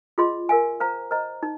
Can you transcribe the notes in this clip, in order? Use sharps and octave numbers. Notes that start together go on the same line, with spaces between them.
F4 G#4 D#5 C6
A#4 F5 G#5
C5 F5 A#5
C5 D#5 A#5
D#4